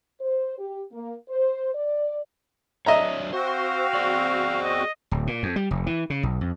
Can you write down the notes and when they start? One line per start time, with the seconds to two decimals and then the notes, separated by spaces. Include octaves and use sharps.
0.20 C5
0.59 G4
0.92 A#3
1.29 C5
1.74 D5
2.86 F#3 D4 C#5 D#5 E5 A#5
3.33 C4 F#4 C5 F5
3.94 G#4 D5
4.63 D#5
5.11 D1
5.27 A#2
5.43 F2
5.56 G3
5.71 F1
5.86 E3
6.10 C#3
6.23 B1
6.41 F2